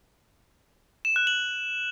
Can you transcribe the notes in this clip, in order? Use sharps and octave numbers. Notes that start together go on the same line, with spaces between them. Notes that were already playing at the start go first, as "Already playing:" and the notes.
E7
F#6
F#7